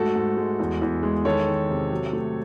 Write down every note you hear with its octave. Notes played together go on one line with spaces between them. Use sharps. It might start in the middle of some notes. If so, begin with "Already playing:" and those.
Already playing: G#2 A3 F#4 A4
G#2
G#3
E2
E2
G#3
D#3 A4 C#5
D#3
C3
F#3
A3